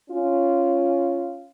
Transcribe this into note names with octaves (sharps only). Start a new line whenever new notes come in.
C#4 F4